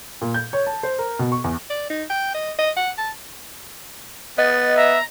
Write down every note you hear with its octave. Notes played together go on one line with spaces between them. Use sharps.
A#2
G6
C#5
A5
C5
A#4
B2
C#6
E2
D5
D#4
G5
D#5
D#5
F#5
A5
B3 D#5 A6
E5 A#5